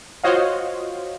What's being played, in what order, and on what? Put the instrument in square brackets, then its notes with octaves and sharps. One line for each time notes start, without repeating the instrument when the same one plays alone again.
[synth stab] F4 F#4 C5 C#5 D#5 F5